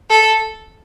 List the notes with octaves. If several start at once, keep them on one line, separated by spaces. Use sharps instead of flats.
A4